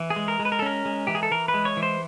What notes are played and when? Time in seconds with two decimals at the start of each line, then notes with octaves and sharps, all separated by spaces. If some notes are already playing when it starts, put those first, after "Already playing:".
Already playing: E3
0.10 G#4
0.16 G#3
0.28 A#4
0.39 G#3
0.45 B4
0.52 A#4
0.59 A4
0.62 C#4 A#4
0.85 G#3
1.07 E3 G4
1.15 G#4
1.23 A4
1.31 E3 A#4
1.48 B4
1.54 G#3
1.65 C#5
1.77 E3
1.83 C5